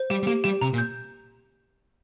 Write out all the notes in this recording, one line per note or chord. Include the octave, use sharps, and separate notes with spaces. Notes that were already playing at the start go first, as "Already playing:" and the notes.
Already playing: C5
G3 G4
G3
A#3 G4
G3 G4
C3 A#5
A#2
G6